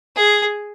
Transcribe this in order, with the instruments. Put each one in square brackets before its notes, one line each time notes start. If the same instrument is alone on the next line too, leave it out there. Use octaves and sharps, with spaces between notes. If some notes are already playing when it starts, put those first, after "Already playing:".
[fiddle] G#4